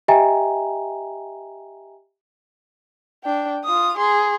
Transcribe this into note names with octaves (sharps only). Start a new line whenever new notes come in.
G4 D#5 E5 G5 G#5 A#5
D4 G5
F4 D#6
G#4 C6